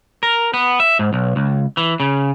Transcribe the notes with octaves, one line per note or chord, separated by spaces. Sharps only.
A#4
B3
E5
G#2
B1
C#2
E3
C#3